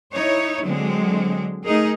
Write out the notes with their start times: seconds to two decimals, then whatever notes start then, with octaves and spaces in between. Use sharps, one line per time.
0.14 D#4 E4 C#5
0.64 D3 F#3 G#3 C4
1.64 A3 D#4 G#4 A#4